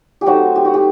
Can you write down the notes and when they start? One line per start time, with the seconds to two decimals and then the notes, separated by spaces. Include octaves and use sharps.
0.21 G4
0.26 F#3 A3 C4 D#4 F#4
0.55 G4
0.65 F#4
0.74 G4